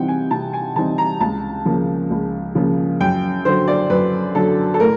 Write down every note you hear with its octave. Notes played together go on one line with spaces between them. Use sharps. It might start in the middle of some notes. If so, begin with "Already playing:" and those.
Already playing: C3 E3 G3 C4 D#4 F#5 G5
G#5
C3 A5
G#5
E3 G3 C4 D#4 A5
A#5
C#2 A5
C#3 F3 A#3
C#2
C#3 F3 A#3
F#2 G5
D3 F#3 C5
D5
F#2 B4
D3 F#3 A4
A4
A2 A#4